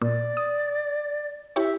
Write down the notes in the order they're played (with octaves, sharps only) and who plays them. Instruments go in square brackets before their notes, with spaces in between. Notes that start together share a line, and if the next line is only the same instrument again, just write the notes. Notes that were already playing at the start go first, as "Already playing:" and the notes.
[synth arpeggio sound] A#2 [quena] D5
[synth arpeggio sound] D#6
[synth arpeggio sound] E4 G4 C#5 [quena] E5